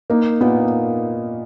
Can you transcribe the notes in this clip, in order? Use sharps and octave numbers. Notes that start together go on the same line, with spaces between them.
A#3 D#4
A#2 B3